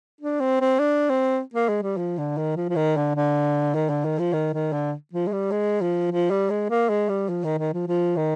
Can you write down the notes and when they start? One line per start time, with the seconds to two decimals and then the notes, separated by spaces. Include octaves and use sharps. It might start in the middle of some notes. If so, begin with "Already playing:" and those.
0.21 D4
0.40 C4
0.61 C4
0.79 D4
1.09 C4
1.54 A#3
1.69 G#3
1.82 G3
1.97 F3
2.18 D3
2.37 D#3
2.56 F3
2.69 F3
2.76 D#3
2.96 D3
3.15 D3
3.74 D#3
3.89 D3
4.05 D#3
4.19 F3
4.33 D#3
4.54 D#3
4.72 D3
5.13 F3
5.27 G#3
5.32 G3
5.51 G#3
5.81 F3
6.11 F3
6.30 G3
6.50 G#3
6.70 A#3
6.89 G#3
7.09 G3
7.29 F3
7.44 D#3
7.59 D#3
7.74 F3
7.87 F3
8.17 D#3